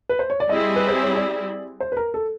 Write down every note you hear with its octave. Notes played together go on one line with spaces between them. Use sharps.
B4
C5
C#5
D5
G3 C4 E4 G#4 D#5
B4
C5
C#5
D5
C5
B4
A#4
A4